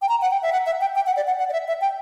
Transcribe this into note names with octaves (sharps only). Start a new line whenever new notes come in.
G5
A#5
F#5
G5
E5
F#5
E5
G5
G5
F#5
D5
F#5
F#5
D5
E5
E5
G5